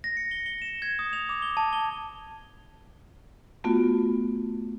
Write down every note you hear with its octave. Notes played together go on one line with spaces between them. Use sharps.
A#6
C#7
G7
G7
E7
G#6
D#6
F7
D6
G7
A5
G7
A3 B3 F4 F#4